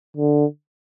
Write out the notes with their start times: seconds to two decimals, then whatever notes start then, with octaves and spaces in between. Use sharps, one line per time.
0.17 D3